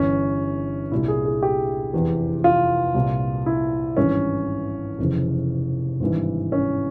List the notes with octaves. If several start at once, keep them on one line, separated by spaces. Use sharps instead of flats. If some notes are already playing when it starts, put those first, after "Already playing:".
Already playing: G1 G2 E3 C#4
C2 A#2 E4
G#4
G#4
G4
F1 E2 C3 E3
F4
C2 A#2
E4
G#1 G2 E3 C#4
F1 F2 C#3 E3
G#1 G2 E3
C#4